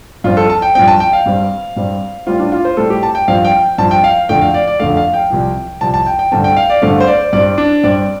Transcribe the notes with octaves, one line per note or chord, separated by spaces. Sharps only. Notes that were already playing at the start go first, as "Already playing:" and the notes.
G2 F3 C4 F4
A4
A5
G5
G2 F3 C4 G5
A5
G5
F5
G2 G3 C4
G2 G3 C4
A2 G3 C4 F4
D4
F4
C5
A2 G3 C4 A4
G4
A5
G5
G2 F3 C4 F5
G5
G2 F3 C4 A5
G5
F5
F2 D3 A3 G5
F5
D5
D5
F2 D3 A3 F5
F5
G5
C2 C3 F3
C2 C3 F3 A5
A5
G5
G5
G2 D3 A3 C4 A5
G5
F5
D5
G2 D3 A3 C4 F5
C5
D5
G2 G3 C4 D5
D4
G2 G3 C4 D5